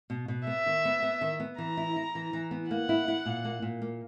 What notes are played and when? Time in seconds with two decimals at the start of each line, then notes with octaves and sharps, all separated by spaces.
0.10 B2
0.28 B2
0.47 B3 E5
0.66 D#3
0.85 B3
1.03 B3
1.21 D#3
1.40 B3
1.58 E3 A#5
1.77 E4
1.96 E4
2.15 E3
2.33 E3
2.51 B3
2.71 A#3 F#5
2.89 E4
3.08 E4
3.26 A#2
3.45 A#3
3.62 A#2
3.82 A#3